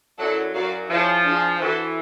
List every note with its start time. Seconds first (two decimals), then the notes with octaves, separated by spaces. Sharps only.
0.18 F#2 F#3 E4 A4 D5 F#5
0.54 F#2 F#3 F#4 A#4 D5 F5
0.89 F3 E4 G#4 C#5 F5 A5
1.25 D4 F4 G#4
1.60 E3 F#4 A4 C5